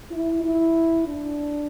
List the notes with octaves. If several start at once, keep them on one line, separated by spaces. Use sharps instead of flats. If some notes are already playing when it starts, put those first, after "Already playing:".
E4
E4
D4